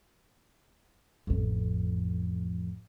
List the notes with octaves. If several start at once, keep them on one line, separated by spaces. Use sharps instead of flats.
A1 F2